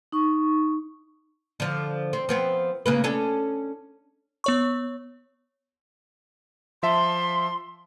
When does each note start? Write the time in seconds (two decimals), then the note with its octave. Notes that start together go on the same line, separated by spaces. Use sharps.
0.12 D#4 C#6
1.60 D3 F3
2.13 C4
2.29 F3 B3 C4
2.86 C#3 A#3 B4
3.04 C#4 D4 A4
4.44 B3 C#5 C#6
6.83 F3 E5 A5 C6